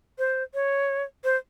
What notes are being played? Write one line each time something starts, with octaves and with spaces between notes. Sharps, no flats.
C5
C#5
C5